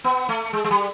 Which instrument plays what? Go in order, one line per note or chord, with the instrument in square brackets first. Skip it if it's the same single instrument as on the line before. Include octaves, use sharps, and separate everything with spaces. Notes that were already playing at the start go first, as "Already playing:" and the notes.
[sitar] B3
A3
G#3
G#3
G3